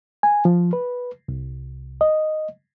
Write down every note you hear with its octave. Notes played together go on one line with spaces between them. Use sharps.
G#5
F3
B4
C2
D#5